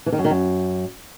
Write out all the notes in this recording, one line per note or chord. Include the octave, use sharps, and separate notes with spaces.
E3
D#3
F#2
D#3
F#2